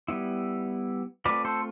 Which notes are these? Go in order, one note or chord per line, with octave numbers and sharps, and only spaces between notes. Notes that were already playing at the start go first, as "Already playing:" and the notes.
G3 B3 E4
A3 C4 F4 B4 D5
A4 C5